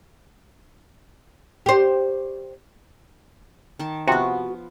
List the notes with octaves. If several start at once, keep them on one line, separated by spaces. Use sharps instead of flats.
G4 C5
D#3 A5
C3 F3 B3 F#4